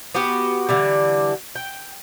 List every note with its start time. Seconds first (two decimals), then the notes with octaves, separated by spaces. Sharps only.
0.15 B3 F#4 G4 B4
0.69 D3 E3 G3
1.55 G5